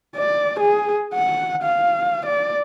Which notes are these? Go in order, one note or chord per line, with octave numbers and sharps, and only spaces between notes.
D5
G#4
F#5
F5
D5